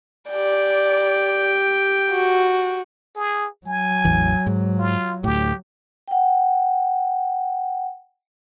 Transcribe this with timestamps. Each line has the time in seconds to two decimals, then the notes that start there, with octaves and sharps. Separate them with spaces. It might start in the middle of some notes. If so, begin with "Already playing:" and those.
0.30 G4 D5 G5
2.11 F#4
3.16 G#4
3.66 F#3 G#5
4.05 A1 E2 E3
4.46 G#2
4.79 F4
5.24 D2 A2 G4
6.08 F#5 G5